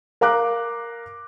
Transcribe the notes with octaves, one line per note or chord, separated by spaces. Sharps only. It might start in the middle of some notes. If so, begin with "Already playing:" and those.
A#4 F5 A#5 D6 F#6